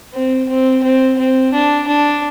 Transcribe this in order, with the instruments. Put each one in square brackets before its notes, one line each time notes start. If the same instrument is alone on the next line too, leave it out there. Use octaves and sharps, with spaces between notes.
[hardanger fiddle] C4
C4
C4
C4
D4
D4